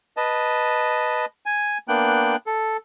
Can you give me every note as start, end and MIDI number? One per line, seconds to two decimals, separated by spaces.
0.17 1.25 71
0.17 1.25 75
0.17 1.25 81
1.46 1.78 80
1.88 2.36 58
1.88 2.36 59
1.88 2.36 62
1.88 2.36 79
1.88 2.36 90
2.46 2.77 69